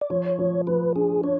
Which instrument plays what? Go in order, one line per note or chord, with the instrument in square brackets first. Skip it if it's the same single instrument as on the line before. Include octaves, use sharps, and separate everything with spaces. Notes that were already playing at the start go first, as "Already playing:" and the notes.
[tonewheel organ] D5
[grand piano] F3 [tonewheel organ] C#5
[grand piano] F3
[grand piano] F3 [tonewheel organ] B4
[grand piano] D4 [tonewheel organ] G#4
[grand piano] D4 [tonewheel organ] C#5